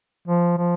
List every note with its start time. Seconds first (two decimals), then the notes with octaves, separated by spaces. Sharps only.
0.28 F3
0.58 F3